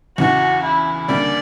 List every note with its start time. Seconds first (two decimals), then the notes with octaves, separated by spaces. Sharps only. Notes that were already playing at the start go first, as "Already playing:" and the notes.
0.17 E2 C#3 E3 F#4
0.63 E4
1.08 D2 C#3 G3 A#3 D4 D5